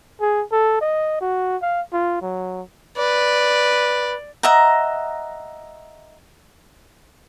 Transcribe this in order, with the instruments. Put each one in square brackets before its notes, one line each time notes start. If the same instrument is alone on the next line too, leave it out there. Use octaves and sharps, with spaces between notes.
[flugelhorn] G#4
A4
D#5
F#4
F5
F4
F#3
[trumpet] B4 [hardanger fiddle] D5
[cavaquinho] D#5 E5 F#5 A#5